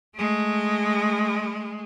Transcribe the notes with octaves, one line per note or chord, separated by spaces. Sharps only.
G#3 A3